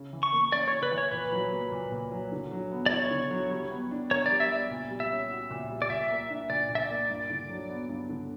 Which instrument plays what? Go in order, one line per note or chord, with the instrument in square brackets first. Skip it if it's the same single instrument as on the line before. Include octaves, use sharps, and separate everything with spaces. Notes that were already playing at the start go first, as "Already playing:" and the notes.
Already playing: [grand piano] C#3
E3
[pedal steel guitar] C#6
[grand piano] A#3
[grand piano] C#4 [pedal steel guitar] D5
[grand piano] C#3 [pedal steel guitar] C#5
[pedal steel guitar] B4
[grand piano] E3
[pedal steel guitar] C#5
[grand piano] A#2 [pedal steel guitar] B4
[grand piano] F#3
A#3
A#2
A#2
F#3
D3
F#3
B3
[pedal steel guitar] D5
[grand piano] E4 [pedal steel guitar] C#5
[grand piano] D3
F#3
G3
B3
D4
[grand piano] A#4 [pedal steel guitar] C#5
[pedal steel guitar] D5
[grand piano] G3
[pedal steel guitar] E5
[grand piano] B3 [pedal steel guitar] D5
[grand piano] A#2
G3
[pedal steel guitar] E5
[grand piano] C#4
F#4
A#2
G3
[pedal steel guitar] D5
[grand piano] A#2 [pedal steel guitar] E5
[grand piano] A#3
D4
[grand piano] A#2 [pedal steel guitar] D5
[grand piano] A#2
[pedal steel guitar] E5
D5
[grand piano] A#3
G2
D3
F#3
B3
G2
D3